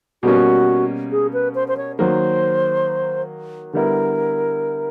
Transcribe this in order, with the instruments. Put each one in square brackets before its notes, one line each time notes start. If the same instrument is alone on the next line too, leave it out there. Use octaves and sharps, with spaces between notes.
[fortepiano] B2 G3 A#3 C#4 [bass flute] F#4
[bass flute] G#4
B4
C5
C5
C#5
[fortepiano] D#3 F#3 A#3 [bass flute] C5
[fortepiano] D3 G3 B3 E4 [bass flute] A#4